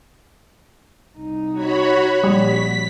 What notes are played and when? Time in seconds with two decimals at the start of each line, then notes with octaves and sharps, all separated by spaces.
1.17 C2 D#4
1.52 F#4 C#5 B5
2.23 A#1 G3 B6